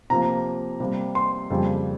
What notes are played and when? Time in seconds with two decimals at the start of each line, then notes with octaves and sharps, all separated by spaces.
0.10 C3 F3 A#3 A#5
0.80 C3 G3 A#3
1.15 C6
1.50 F2 C#3 G3 A#3